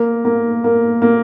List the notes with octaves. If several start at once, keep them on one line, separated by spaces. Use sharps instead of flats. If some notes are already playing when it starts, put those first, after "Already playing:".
Already playing: A#3
A#3
A#3
A#3